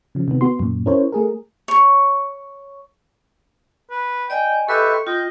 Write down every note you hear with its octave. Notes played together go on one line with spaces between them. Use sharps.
C#3 F3
C3 D#3 B3
B3 F#4 C6
F#2 A#2
C#4 E4 A#4 C5 C#5
A3 G#4 A#4
C#5 C#6
B4
D5 D#5 G5 G#5
G4 A4 B4 D#5 E5 B5 C#6
C6
F4 D#5 G5